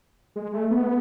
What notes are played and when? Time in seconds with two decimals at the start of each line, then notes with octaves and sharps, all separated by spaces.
0.36 G#3
0.53 A3
0.71 B3